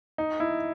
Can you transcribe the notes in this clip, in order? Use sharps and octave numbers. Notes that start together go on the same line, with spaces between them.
D#4
E4